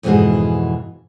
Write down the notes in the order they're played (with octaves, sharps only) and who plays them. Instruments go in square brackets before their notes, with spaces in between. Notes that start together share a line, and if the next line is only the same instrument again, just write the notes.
[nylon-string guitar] F2 G#2 B2 E3 F#4 G#4